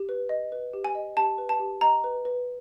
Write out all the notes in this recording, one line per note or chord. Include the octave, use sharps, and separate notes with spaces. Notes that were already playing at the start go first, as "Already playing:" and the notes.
Already playing: G4
B4
D#5
B4
G4
G#5
D#5
G4 A5
B4
A5
G4
D#5 A#5
B4
B4